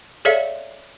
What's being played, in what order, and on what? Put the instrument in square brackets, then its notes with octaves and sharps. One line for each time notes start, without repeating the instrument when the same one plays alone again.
[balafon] G#4 A4 C#5 D5 E5 F5